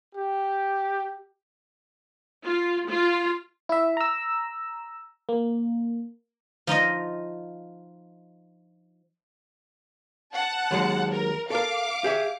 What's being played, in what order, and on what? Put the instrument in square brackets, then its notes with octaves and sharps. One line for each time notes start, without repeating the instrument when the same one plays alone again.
[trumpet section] G4
[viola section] F4
F4
[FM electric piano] E4 E5
A#5 E6
A#3
[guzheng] F3 D#4 F4 D#5
[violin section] F#5 A5
[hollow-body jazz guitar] D#2 F#3 G#3
[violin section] A#4
[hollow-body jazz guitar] A4 A#4 [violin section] F5 D6
[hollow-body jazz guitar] G4 G#4 E5